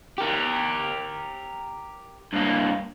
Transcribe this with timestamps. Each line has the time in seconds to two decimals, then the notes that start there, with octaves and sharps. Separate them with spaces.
0.18 G4 A#4
2.33 G2 A#3